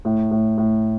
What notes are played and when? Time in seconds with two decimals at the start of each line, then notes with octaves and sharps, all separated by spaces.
0.05 A2
0.31 A2
0.58 A2